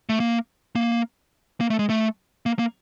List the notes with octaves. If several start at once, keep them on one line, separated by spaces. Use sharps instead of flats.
A3
A#3
A#3
A#3
A3
G#3
A3
A#3
A#3